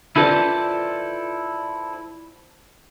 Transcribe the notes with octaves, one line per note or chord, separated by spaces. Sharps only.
E4 F4 A4 B4 C5 D5